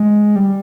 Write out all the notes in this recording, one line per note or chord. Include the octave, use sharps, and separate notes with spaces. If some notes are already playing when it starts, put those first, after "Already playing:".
Already playing: G#3
G3